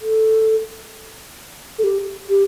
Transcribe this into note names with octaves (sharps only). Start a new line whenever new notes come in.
A4
A4
G4
G4